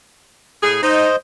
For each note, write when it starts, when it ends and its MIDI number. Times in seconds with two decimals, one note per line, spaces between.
0.63 0.82 45
0.63 0.82 68
0.83 1.09 63
0.83 1.16 72
0.83 1.16 75